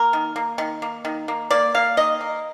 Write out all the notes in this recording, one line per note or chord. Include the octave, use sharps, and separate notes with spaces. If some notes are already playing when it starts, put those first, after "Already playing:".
Already playing: A#3 A#4
D#3
A#3
D#3
A#3
D#3
A#3
A#3 D5
A#3 F5
D#3 D#5
A#3